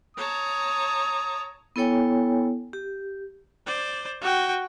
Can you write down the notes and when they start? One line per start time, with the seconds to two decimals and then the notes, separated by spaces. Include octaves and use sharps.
0.17 C#5 A5 A#5 D#6
1.76 B3 E4 A4 C#5 G5 G#5
2.73 G4
3.67 C5 D5
4.22 F#4 G5